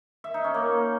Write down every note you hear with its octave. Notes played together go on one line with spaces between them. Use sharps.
E5
D#4
C#4
A#3